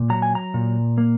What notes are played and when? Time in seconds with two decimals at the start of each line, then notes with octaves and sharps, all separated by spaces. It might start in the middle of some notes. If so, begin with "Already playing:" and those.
Already playing: A#2
0.10 F#3 A#5
0.22 G#5
0.35 A#5
0.54 A#2
0.98 A#3